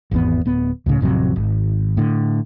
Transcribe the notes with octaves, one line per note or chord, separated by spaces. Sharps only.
G#1 E2 B3
D1 B3
C#2 A2 C#3
A1 F2 C3 F#3
G#1
A2 D3